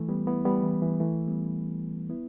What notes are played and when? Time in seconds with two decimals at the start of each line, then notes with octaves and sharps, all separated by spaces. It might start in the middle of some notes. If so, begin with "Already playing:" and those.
Already playing: E3 A3
0.09 G3 B3
0.27 B3 E4
0.45 G3 B3
0.63 E3
0.82 E3
1.00 E3 A3
1.28 G3 B3
2.10 B3 E4